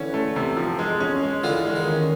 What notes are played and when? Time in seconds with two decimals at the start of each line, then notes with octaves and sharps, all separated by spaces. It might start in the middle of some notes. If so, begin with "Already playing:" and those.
Already playing: D3 E3 C#4
0.14 A3
0.36 C3
0.57 F3
0.79 G#3
1.00 C#4
1.23 G#3
1.43 D3 E3 F4
1.65 G#3
1.76 D#3
1.87 C#4